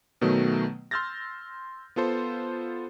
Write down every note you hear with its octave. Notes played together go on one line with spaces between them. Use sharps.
B2 D#3 F#3 A3 B3
C6 E6 F6 G6 A6 A#6
B3 F4 A4 C5